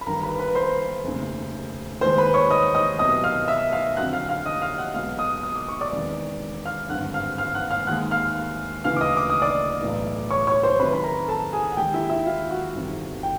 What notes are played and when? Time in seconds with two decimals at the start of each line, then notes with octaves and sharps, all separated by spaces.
0.01 B5
0.06 G1 G2 D#3 G3 A#4 A#5
0.23 B4 B5
0.39 B4 B5
0.55 C5 C6
1.04 F1 D#2 C#3
2.01 D#2 D#3 G#3 C5 C6
2.18 B4 B5
2.34 C#5 C#6
2.50 D#5 D#6
2.75 D#5 D#6
2.99 C2 B2 F#3 D#5 D#6
3.24 F5 F6
3.48 E5 E6
3.73 F5 F6
3.97 F2 D3 F#3 F#5 F#6
4.13 F5 F6
4.29 F5 F6
4.46 D#5 D#6
4.62 F5 F6
4.78 F#5 F#6
4.94 B1 B2 G#3 F5 F6
5.19 D#5 D#6
5.43 D#6
5.56 D6
5.68 C#6
5.81 D5 D6
5.92 E1 E2 C3 D#3
6.65 F5 F6
6.89 G#1 G2 D3 F#5 F#6
7.14 F5 F6
7.38 F5 F6
7.55 F#5 F#6
7.71 F5 F6
7.87 D#2 D#3 G#3 F#5 F#6
8.11 F5 F6
8.84 D2 C#3 E3 F5 F6
8.97 D6
9.01 D#5 D#6
9.17 D6
9.30 D#6
9.42 D5 D6
9.82 B1 A2 E3
10.31 C#5 C#6
10.47 C#5 C#6
10.63 C5 C6
10.79 C#2 C3 D#3 F#3 B4 B5
10.93 B5
11.04 A#4 A#5
11.28 A4 A5
11.53 G#4 G#5
11.72 F#5
11.77 D#2 D#3 G#3 G4 G5
11.94 E4 E5
12.10 E4 E5
12.26 F4 F5
12.50 F#4 F#5
12.75 G1 F2 C3 D#3 G3
13.23 G5